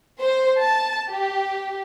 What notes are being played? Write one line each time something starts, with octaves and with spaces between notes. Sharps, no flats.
C5
A5
G4